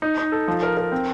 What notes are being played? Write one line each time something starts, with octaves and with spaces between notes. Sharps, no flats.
D#4
D#4
A4
F3
A#4
A#4
C4